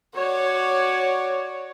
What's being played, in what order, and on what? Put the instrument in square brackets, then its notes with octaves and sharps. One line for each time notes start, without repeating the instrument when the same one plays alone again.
[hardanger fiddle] F#4 D5 [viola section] C#5